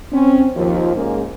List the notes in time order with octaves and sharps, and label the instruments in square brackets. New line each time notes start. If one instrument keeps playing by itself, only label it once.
[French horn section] C4 C#4
D#2 F3
G#2 A#3 C#4 G#4